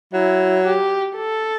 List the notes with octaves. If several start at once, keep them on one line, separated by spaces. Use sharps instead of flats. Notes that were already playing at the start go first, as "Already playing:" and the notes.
F#3 E4
G4
A4